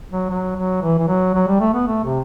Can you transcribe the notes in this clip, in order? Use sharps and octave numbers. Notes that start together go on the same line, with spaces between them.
F#3
F#3
F#3
E3
E3
F#3
F#3
G3
A3
B3
A3
C3